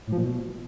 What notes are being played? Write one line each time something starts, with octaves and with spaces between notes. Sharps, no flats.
A2
F3
A#2
B2